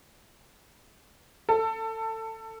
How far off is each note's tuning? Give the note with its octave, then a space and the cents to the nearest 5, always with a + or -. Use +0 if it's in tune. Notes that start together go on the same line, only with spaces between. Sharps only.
A4 +20